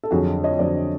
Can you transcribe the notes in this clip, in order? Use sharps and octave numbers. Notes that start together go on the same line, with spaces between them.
A4
F2 D3 F#3 F#4 G#4
C#5 D#5
F2 D3 F#3 C5 D5